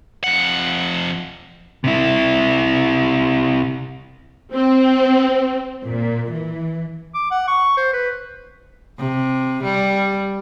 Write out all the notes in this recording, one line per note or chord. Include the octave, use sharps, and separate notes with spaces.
F2 F#5
C3 E4
C4
A#2
E3
D6
F#5
C#6
C5
B4
C3
G3